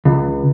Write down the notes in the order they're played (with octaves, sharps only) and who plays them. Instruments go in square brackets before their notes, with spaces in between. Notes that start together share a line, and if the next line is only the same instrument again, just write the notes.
[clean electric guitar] C#2